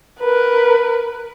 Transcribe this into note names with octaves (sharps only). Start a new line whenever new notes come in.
A#4 B4